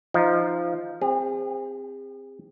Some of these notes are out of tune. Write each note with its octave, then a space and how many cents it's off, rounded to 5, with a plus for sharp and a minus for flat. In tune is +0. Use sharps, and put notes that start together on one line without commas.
F3 -10 D#4 +0
C4 +0 G#4 -40